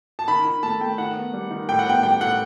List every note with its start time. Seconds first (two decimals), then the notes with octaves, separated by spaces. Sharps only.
0.19 A5
0.28 D#3 B5
0.45 D#3
0.63 A3 A5
0.80 A3 G5
0.98 D#3 F#5
1.16 B3
1.33 G3
1.51 D#3
1.69 A2 G5
1.79 F#5
1.86 B3 G5
2.03 G3 G5
2.21 A2 F#5